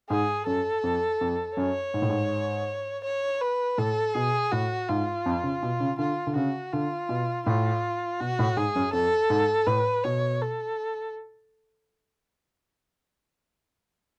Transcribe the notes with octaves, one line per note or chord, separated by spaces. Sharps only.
G#2 G#4
F#2 A4
F2
F2
F#2 C#5
G#2
A2
G#2
C#5
B4
A2 A4
B2 G#4
A2 F#4
G#2 F4
F2
C#3
B2
C#3
D3 F4
D3
C#3 F#4
D3 F4
B2
A2 F4
B2 F#4
A2
G#2 G#4
F#2
F2 A4
G#2
A2 B4
B2 C#5
A4